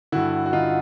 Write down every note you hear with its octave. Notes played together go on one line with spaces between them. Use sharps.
G2 D3 E4 F#4
F#4
D3 D#4 F4